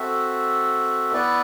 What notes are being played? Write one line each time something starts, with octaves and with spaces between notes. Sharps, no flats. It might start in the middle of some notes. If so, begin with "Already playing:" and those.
Already playing: C4 F#4 A4 E5
B3 E4 B4 D5